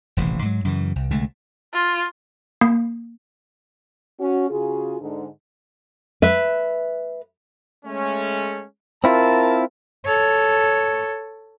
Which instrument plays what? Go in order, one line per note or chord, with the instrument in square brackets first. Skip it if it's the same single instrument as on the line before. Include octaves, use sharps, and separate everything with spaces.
[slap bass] D#1 A1 C3 E3
G#2 F#3
F#2 C#3 E3
C2
C2 D3 G#3 A3
[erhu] F4
[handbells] A#3
[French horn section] C#4 F#4
C#3 F4 F#4 G#4
G#2 D3
[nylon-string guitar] B4 E5
[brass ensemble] G#3 A3 C#4
[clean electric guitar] C4 E4 F4 [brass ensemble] A#4 A5
[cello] A4 C#5